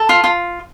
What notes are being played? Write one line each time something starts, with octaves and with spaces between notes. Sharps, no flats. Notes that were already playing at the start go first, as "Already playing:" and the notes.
Already playing: A4
F4
F4